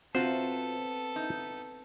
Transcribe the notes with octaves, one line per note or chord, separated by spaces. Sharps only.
C3 B3 C4 F4 F#4 A4 C5
D#4